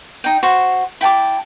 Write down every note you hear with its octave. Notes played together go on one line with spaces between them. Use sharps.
D#4 G5
F#4 C5
E4 G5 A5 D6